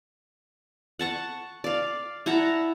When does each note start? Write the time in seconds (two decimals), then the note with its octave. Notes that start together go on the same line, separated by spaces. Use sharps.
0.99 F#5 A5 C#6
1.64 D5 F5
2.26 E4 F#5 A5 A#5